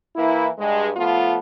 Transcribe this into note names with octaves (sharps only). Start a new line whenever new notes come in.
E3 A#3 E4
G2 G#3
F3 A3 B3 F4